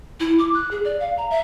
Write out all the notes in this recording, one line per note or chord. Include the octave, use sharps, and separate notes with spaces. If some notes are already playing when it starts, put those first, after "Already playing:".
E4
D6
F#6
G#4
D5
F5
A#5
E5